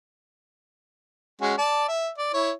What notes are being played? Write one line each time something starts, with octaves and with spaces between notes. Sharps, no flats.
G#3 C#4 F#4
D5 A5
E5
D5
E4 C#5